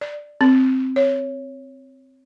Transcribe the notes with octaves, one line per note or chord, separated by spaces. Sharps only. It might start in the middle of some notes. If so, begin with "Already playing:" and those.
D5
C4
C#5